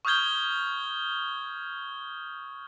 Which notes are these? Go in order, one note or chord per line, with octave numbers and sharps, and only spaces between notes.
C#6 D#6 F6 G6 G#6 G7